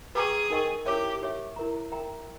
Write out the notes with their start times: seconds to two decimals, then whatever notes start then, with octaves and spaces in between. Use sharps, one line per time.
0.15 G#4 B4 G5 A#5 C#6
0.50 D#4 A#4 D#5 G5 C#6
0.86 C#4 E4 G4 A#4 C#5 E5
1.20 D#4 G4 C#5 E5
1.56 E4 A#4 E5 A#5
1.92 A#4 E5 G5 A#5